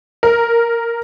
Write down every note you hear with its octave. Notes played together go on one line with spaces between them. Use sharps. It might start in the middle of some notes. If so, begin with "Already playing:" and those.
A#4